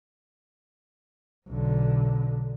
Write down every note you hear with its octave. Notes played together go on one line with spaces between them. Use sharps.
B1 D3